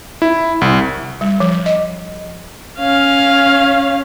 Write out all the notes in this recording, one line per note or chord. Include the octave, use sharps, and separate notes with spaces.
E4
C2
G3
F3
D#5
C#4 F5